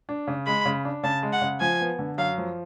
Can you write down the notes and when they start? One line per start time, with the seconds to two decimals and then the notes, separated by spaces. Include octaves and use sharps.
0.09 D4
0.27 C#3
0.46 G#3 B5
0.65 C#3
0.85 D4
1.03 C#3 A5
1.23 G#3
1.33 F#5
1.41 C#3
1.60 F3 G#5
1.81 B3
1.99 D3
2.18 F#2 F5
2.38 F3